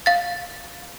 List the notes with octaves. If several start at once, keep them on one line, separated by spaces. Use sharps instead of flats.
F5 A6